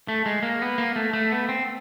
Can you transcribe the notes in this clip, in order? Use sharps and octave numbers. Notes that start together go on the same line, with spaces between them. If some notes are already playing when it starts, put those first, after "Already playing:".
A3
G#3
A#3
B3
A#3
A3
A3
B3
C4